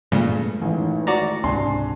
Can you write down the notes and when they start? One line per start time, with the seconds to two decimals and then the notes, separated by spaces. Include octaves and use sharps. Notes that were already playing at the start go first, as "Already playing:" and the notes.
0.12 G2 A#2 C#3 F3 G#3 A3
0.61 A1 D#3 C#4
1.07 F#4 D5 A#5
1.44 C#2 G#2 C3 D4 G#5 C6